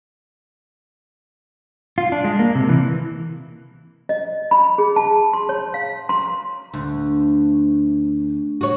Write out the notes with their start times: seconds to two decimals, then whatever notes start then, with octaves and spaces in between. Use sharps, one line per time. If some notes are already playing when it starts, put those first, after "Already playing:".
1.98 F4
2.12 D4
2.24 G#3
2.39 A#3
2.55 C3
2.69 E3
4.09 D#5
4.51 B5
4.78 G#4
4.96 A5
5.33 C6
5.49 C#5
5.74 F5
6.09 C6
6.74 D2
8.61 F#4 C#5